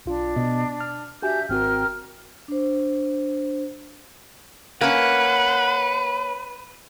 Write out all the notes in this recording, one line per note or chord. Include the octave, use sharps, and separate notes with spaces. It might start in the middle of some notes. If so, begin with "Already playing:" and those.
B1 D4 F4
B2 B3 D#5
F6
D4 F#4 G4 E5 G#5 G6
G#1 C4 F#4 A#4 G5 F6
D4 C5
A#3 C#4 B4 F#5